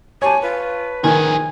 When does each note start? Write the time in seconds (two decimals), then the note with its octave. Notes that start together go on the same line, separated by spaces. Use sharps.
0.22 G4 C#5 G#5 A5
0.42 F4 B4
1.04 D#3 F3 G#4 G#5